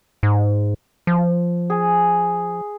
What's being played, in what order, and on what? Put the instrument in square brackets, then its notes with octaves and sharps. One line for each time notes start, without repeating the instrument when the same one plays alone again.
[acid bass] G#2
F3
[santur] G#4